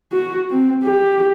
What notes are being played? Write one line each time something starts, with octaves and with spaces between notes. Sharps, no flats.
F#4
C4
G4